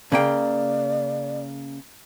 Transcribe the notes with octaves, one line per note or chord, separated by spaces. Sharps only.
C#3 A#3 D5 G5